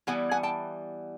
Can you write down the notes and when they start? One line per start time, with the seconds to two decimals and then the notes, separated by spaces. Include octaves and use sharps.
0.07 E3 G3 B3 E4 F#5 G#5
0.31 F#5 G#5
0.43 G5 A5